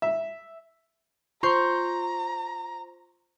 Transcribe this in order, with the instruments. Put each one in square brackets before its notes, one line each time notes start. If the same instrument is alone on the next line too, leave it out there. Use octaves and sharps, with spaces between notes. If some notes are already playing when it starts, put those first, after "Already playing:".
[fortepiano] E5
[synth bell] F4 C5 [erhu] A#5 [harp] C6 C#6 G6